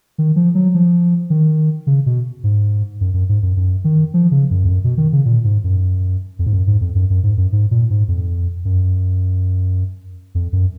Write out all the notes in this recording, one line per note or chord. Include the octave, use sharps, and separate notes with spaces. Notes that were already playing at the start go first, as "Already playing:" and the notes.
D#3
F3
F#3
F3
D#3
C#3
B2
G#2
F#2
F#2
G#2
F#2
F#2
D#3
F3
C#3
F#2
F2
F#2
B2
D#3
C#3
A#2
G#2
F#2
F2
G#2
F#2
G#2
F2
F#2
F#2
G#2
F#2
G#2
A#2
G#2
F2
F#2
F2
F#2